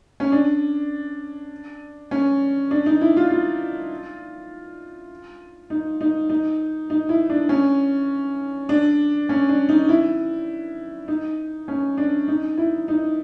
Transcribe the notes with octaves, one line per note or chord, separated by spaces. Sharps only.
C#4
D4
C#4
D4
D#4
E4
F4
F4
D#4
D#4
D#4
D#4
E4
D4
C#4
D4
C#4
D4
D#4
E4
D#4
C#4
D4
D#4
E4
D#4